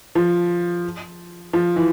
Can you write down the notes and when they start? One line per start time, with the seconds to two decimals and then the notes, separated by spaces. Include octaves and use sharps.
0.15 F3
1.53 F3
1.76 E3